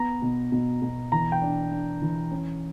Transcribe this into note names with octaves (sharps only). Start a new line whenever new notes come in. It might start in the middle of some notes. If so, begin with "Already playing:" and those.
Already playing: B3 A#5
B2
B2
B2
E3 A#5
G5
D4
D4
E3
C#4